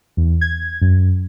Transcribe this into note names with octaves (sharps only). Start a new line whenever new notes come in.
E2
G#6
F#2